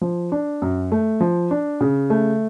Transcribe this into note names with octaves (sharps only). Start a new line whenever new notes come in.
F3
D4
F#2
A3
F3
D4
C#3
A3